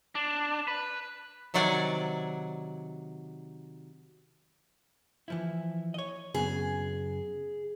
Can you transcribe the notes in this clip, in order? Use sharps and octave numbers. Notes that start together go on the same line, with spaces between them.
D4
B4
C3 D#3 F#3 D5 F#5 G#5
E3 F3 E4
C#5 D#5
F#2 C#3 B3 G#4